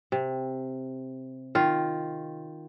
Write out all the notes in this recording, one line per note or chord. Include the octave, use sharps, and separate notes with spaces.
C3
D#3 F4